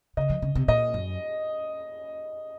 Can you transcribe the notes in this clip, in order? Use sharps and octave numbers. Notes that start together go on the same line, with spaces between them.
C#3 D#5
F3
C#3
C3
A#2 D#5
F#2